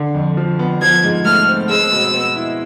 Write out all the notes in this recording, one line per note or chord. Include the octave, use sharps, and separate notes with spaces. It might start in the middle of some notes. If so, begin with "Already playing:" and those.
Already playing: D3
F2
F3
B3
F3 G#6
G#2
A3 F6
C4
G#3 E6
B2
B3
E4